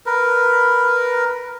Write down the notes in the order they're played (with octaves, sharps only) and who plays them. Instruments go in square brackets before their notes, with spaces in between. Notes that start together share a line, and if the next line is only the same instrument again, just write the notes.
[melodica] A#4 B4